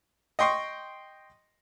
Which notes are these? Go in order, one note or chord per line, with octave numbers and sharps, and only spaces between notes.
D#5 G5 C6 C#6